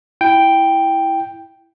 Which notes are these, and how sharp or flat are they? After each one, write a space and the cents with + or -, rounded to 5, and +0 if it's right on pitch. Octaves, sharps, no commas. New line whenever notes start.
E4 +0 G5 +0